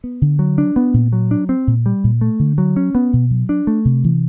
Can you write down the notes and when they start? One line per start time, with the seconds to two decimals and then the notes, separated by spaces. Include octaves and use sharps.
0.04 B3
0.22 D3
0.39 F#3
0.58 D4
0.76 B3
0.94 A#2
1.13 F#3
1.31 D4
1.49 C4
1.67 A#2
1.86 G3
2.04 A#2
2.21 A3
2.39 D3
2.58 F#3
2.76 C#4
2.95 B3
3.13 B2
3.31 F#3
3.49 D4
3.67 A3
3.85 C3
4.04 E3